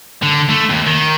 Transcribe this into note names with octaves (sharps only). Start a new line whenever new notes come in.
D3
A3
D#2
D#3